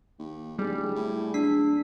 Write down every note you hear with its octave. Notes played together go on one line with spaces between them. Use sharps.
D#2
D1 G3 G#4
A2
D1 D4 B6